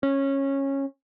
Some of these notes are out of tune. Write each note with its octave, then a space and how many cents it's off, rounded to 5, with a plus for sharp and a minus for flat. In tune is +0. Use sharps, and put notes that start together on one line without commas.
C#4 -15